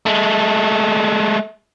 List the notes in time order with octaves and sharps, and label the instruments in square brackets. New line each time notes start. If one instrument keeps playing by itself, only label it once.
[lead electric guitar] G#3 A3